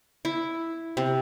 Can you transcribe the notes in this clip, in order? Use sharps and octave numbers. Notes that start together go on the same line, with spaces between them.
E4
C3